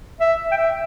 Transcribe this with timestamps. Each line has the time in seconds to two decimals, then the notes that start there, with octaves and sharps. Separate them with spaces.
0.20 E5
0.52 G5
0.57 E5